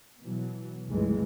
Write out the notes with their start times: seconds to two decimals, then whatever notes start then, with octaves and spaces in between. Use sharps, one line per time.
0.20 B2 E3 F#3
0.87 F1 C#2 G2 E3 G#3